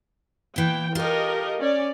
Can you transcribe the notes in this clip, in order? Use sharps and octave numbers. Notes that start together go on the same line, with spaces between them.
A#2 E3 G5
F4 G4 A4 A#4 D#5
C#4 D5